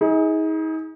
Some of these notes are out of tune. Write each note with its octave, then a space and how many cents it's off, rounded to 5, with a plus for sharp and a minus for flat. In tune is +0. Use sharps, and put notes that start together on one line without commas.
D#4 +40 G#4 +0